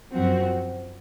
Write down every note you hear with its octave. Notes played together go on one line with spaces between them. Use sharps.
F#2 F3 C4 F#4